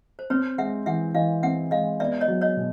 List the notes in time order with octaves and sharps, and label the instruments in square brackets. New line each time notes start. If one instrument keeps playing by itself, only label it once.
[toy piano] C5
[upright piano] C4 [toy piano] B4 C#5
[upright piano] G#3 [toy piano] E5 F#5
[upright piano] E3 [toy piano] E5 F#5
[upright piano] E3 [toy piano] D#5 F5
[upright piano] C4 [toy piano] E5 F#5
[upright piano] G#3 [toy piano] D#5 F5
[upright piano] B3 [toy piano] D5 E5
[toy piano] C#5 D#5
[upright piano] F#3
[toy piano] C#5 D#5
[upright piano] B2